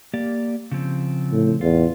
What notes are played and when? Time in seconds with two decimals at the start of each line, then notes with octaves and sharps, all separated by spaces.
0.14 A#3 G4 D5
0.71 C#3 F3 C4
1.32 A2
1.61 E2 F4